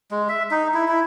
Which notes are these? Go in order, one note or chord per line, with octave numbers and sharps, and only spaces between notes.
G#3
E5
D#4
E4
E4